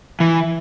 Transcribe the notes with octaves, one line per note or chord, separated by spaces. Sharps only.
E3